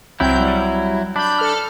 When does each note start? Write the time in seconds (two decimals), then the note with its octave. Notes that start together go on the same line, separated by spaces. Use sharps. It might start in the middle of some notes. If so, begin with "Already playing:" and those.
0.20 C2 F#3 C4 E4 G6
0.40 G3
1.16 D4 B5 G6
1.38 A4 F6